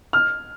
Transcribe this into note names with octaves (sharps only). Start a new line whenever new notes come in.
F6